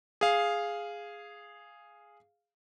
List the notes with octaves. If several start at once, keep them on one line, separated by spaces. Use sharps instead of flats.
G#4 F5